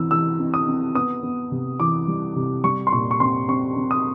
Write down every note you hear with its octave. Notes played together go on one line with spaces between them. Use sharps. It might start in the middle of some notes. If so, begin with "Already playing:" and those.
Already playing: E3 C4 E6
E3 E6
C4
D#6
C4
B3 D#6
B3
C3
E3 D6
G3
C3
G3 C#6
C6
A#2 C#6
C#6
C4 C6
C4 C#6
C4
D#6